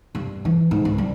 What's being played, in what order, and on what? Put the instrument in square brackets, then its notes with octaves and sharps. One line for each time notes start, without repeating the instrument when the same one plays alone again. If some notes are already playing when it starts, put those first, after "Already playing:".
[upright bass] G2
E3
G#2
C#2
G3